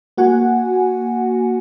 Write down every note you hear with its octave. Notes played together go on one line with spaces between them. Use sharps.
A#3 F#4 F#5 G#5